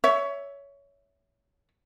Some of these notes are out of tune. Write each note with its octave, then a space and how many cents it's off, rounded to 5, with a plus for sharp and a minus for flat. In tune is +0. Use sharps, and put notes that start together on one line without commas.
C#5 +20 E5 +0